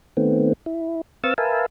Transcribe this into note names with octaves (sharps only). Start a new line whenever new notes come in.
D#3 A3 B3 C4
E4
C4 B4 F5 C#6 E6 A6
A#4 B4 E5 F5 G#5 A5